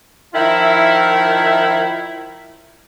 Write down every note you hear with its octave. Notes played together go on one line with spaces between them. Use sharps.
D#3 F3 E4